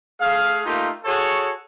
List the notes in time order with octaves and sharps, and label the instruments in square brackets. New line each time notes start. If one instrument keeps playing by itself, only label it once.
[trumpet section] A3 G#4 F5
A3 A#3 D#4 F4 G4
F#4 G#4 A4 C#5